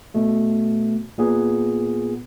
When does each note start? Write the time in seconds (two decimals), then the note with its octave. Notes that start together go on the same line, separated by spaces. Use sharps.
0.14 B2 A3
1.18 A#2 B3 G#4